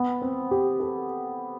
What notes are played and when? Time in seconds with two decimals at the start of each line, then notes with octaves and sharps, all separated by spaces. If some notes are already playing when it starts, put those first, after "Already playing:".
Already playing: B3
0.22 C4
0.51 G4
0.80 A4